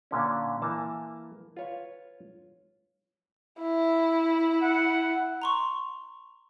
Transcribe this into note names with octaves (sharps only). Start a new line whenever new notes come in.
A#2 D3 C#4
E3 A#3 A5
F4 B4 C#5
E4
F#5
A#5 C6 C#6